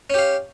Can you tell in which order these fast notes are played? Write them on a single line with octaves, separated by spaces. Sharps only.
C#4 G4 F5